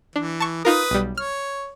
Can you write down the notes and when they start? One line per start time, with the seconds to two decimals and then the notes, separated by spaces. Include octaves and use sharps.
0.16 E3 D4
0.40 A5 C#6
0.65 D#4 F4 A#4 B4 D#6
0.91 B1 G3
1.17 C#5 F6